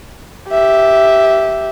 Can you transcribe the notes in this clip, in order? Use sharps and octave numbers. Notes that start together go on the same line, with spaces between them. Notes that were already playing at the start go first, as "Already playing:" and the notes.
G4 E5